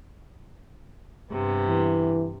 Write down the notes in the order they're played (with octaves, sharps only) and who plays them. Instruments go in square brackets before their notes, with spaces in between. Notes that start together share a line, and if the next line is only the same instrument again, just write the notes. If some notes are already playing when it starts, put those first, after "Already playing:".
[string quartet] G2 C3 B3
[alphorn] E3